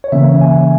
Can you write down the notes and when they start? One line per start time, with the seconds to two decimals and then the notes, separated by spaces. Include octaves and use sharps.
0.04 C#5
0.12 C#3 E3 A#3 C#4 E5
0.41 G#5